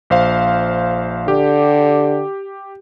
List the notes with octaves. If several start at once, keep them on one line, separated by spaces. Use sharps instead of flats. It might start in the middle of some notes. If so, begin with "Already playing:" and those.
A#1 C5 F5
D3 G4